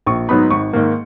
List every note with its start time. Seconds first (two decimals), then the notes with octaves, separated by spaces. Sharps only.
0.06 A#1 C#6
0.29 G#2 F#3 B3 D#4 B5
0.51 G#1 C#6
0.73 G#2 D#3 A#3